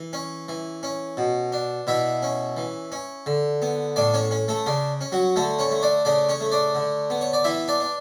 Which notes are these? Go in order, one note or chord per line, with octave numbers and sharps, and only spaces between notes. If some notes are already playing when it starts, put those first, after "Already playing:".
Already playing: E3
C#4
E3
C#4
B2
D4
B2 E4 E5
C#4
E3
C#4
D3
B3
A2 D4 D5
C#4 C#5
C#4
A3 A4
C#3 D4
C#4
F#3 F#4
D3 A3 A4
C#4 C#5
A3
D4 D5
C#3 D4 D5
C#4 C#5
A3
D4 D5
D3
B3
C#5
D5
E3 E4 E5
D4 D5
D4